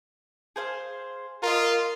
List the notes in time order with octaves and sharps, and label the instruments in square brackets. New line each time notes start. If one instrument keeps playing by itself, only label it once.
[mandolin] G#4 C5 F5
[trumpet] F4 [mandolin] A#4 D#5